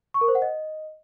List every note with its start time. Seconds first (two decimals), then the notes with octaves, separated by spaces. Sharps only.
0.14 C#6
0.21 A#4
0.28 C5
0.35 F#5
0.42 D#5